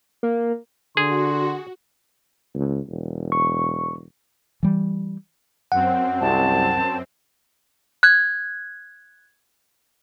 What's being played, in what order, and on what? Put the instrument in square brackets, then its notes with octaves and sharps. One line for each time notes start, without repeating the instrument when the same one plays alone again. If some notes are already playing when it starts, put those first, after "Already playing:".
[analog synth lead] A#3
[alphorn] D3 [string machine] F#4 [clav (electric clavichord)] G#4 [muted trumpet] C6
[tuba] C#2
E1
[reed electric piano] C#6
[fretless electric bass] E3 G3
[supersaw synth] F#2 C4 [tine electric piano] F#5
[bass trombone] C2 [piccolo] A5
[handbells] F#6 G#6